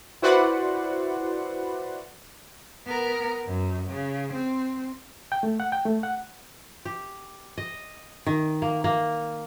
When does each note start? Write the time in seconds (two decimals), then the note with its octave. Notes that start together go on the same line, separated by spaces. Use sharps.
0.22 E4 F#4 B4 C5 D5 F#5
2.86 B3 A#4
3.46 F#2
3.90 C#3
4.34 C4
5.32 G5
5.43 A3
5.60 F#5
5.72 G5
5.86 A3
6.03 F#5
6.85 G4
7.58 D#5
8.26 D#3
8.62 A#3
8.84 A#3